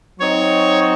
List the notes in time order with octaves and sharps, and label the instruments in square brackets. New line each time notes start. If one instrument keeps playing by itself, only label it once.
[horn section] F#3 C4 D#4 [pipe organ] C#5